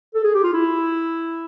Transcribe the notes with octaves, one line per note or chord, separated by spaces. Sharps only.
A4
G#4
G4
F4
E4